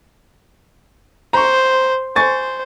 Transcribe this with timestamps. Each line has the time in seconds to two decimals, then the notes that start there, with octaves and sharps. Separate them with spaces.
1.33 C5 A#5 C#6
2.16 C5 G#5 C#6 A6